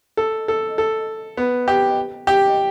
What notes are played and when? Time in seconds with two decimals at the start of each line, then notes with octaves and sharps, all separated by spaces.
0.17 A4
0.48 A4
0.78 A4
1.37 B3
1.68 G4
2.27 G4